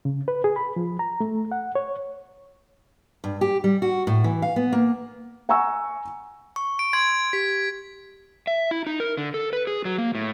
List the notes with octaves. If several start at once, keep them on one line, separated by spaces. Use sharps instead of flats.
C#3
B4
G#4
B5
F3
A#5
A3
F#5
C#5
G2
G4
G3
F#4
A2
E3
F5
B3
A#3
F#5 G#5 A#5 C#6 E6
C#6
D7
C6 G#6
G4 B6
E5
E4
D#4
A#4
D3
A4
B4
G#4
F#3
A#3
A2